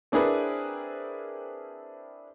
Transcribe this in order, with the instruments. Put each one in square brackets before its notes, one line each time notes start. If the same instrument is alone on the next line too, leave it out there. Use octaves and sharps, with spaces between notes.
[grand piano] C4 D4 E4 G#4 A#4 B4